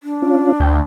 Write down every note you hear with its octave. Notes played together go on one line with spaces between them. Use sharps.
D4
C#4 F4
D2 G5